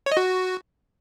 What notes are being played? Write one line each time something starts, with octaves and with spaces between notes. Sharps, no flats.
C#5
D#5
F#4